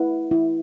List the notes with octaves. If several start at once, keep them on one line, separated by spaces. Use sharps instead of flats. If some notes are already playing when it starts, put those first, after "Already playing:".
Already playing: E4 B4 F#5
E4